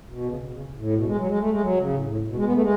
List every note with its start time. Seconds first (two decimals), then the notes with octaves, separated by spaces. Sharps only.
0.10 B2
0.27 C#3
0.43 B2
0.52 C#3
0.77 A2
0.94 B2
1.05 G#3
1.16 F#3
1.27 G#3
1.38 A3
1.50 G#3
1.61 F#3
1.77 C#3
1.94 A2
2.05 A2
2.27 B2
2.36 G#3
2.44 B3
2.53 A3
2.61 G#3